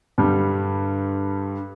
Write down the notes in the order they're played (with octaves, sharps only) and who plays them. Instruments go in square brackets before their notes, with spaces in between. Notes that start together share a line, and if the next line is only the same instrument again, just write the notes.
[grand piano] G2 D3 G3